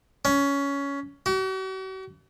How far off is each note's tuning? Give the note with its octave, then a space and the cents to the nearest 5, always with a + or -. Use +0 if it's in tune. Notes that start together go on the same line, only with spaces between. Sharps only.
C#4 +15
F#4 +45